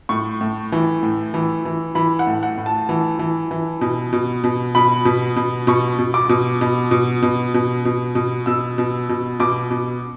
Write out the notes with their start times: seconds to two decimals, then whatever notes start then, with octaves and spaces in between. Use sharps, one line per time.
0.09 A2 C#6
0.41 A2
0.72 E3
1.03 A2
1.34 E3
1.65 E3
1.95 E3 B5
2.19 F#5
2.27 A2
2.43 F#5
2.57 A2
2.66 A5
2.89 E3
3.19 E3
3.51 E3
3.81 B2
4.13 B2
4.44 B2
4.75 B2 B5
5.05 B2
5.36 B2
5.67 B2 C#6
5.99 B2
6.14 D6
6.29 B2
6.61 B2
6.91 B2
7.22 B2
7.54 B2
7.85 B2
8.15 B2
8.46 B2 E6
8.78 B2
9.09 B2
9.40 B2 D6
9.71 B2